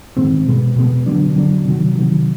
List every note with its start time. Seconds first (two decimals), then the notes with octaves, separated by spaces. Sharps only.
0.17 G#2 D#3 G#3 C4
0.46 B2 G#3 B3
0.76 B2 G#3 B3
1.06 D3 F#3 B3 D4
1.36 D3 F#3 B3 D4
1.65 C3 D#3 F#3
1.95 C3 D#3 F#3